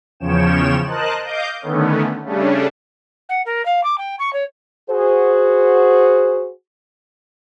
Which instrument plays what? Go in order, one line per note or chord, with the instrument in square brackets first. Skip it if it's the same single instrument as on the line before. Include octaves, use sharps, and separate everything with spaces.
[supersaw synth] E2 C#3 F3 C#5 G5 E7
A#4 C5 D#5 A5 F#6
D#5 F5 D6 G6
D3 D#3 A3 B3 C#4
C#3 G3 A3 C#4 D4
[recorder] F#5
A#4
F5
D6
G5
C#6
C#5
[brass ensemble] F#4 G#4 C5